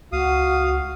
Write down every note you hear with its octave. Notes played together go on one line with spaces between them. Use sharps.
C#2 F#4 F5 D#6